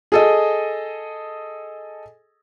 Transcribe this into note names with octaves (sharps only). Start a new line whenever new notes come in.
G#4 A4 D#5